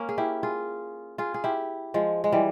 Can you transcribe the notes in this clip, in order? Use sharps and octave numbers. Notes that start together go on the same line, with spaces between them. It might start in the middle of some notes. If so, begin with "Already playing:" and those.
Already playing: A#3 C#4
G#4
E4 G4
F4 G#4
F4 G#4
G#4
E4 G4
F3 G#3
G#3
E3 G3